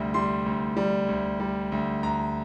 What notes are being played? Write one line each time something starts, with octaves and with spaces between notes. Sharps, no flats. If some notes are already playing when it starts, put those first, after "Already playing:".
Already playing: D2 C3 G3
G3 C6
D2
G3
D2
G3
D2
D2 A#5